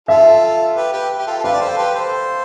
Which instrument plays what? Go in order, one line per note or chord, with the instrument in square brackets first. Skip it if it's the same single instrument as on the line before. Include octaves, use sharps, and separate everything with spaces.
[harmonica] F4 A4 [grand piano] E5
[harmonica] G4 B4
G4 B4
G4
F4 A4
A4
[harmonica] G4 B4 [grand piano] F5
[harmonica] D5
A4 C5
G4 B4
A4 C5